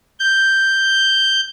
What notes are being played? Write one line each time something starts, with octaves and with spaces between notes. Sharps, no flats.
G6